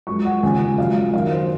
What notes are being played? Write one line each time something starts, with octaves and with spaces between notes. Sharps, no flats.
F#2 F3 G#3 C#6
F#5
D#2 C#3 F3 G#3 G#5
F#2 F3 G#3 F5
F#2 D#3 F#3 F5
C5